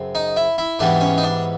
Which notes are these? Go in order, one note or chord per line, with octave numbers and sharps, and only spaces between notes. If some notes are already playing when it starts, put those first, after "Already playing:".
Already playing: F#2 C#3 C4
D#4
E4
E4
G#2 E3 G3 B3 D4
C#4
D#4
D4